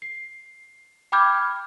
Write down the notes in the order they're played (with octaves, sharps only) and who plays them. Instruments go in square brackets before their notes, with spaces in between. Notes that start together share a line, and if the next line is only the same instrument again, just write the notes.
[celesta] C7
G5 B5 D6 F6 G6 G#6